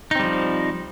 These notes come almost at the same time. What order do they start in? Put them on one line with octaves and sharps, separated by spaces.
D#4 C4 G3 F3